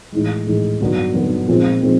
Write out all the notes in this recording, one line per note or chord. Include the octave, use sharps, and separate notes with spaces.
A2 E3 G#3
A2 E3 G#3
G2 D3 F#3 B3
G2 D3 F#3 B3
A#2 F3 G#3 C4
A#2 F3 G#3 C4